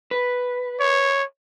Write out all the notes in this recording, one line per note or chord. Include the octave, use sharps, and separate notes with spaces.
B4
C#5